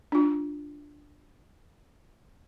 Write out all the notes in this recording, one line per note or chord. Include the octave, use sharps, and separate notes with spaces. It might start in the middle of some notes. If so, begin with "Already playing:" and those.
D4 F4